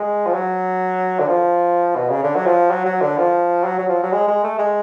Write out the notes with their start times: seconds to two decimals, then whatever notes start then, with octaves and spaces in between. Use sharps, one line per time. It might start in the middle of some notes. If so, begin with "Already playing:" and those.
Already playing: G#3
0.27 F3
0.34 F#3
1.19 D3
1.28 F3
1.95 B2
2.09 C#3
2.23 D3
2.36 F#3
2.46 F3
2.71 F#3
2.86 F#3
3.01 D3
3.18 F3
3.64 F#3
3.79 F#3
3.89 F3
4.03 F#3
4.13 G#3
4.28 G#3
4.44 A3
4.59 G#3